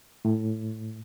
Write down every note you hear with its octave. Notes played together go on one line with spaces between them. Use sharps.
A2